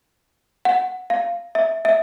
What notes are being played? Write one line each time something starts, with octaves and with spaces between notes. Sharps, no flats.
F#5
F5
E5
E5